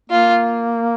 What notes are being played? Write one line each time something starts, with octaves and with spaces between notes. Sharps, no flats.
A#3 F4